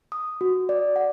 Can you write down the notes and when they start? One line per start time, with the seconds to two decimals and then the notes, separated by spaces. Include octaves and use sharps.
0.12 D#6
0.41 F#4
0.69 D5
0.96 F#5